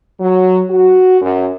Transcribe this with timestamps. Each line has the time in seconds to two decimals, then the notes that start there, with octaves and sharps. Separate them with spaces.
0.20 F#3
0.70 F#4
1.21 F#2